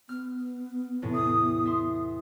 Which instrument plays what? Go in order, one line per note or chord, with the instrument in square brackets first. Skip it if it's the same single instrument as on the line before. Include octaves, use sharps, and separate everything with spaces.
[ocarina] B3 [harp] F6
[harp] E2 A2 C3
[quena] D#6
[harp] E5 C6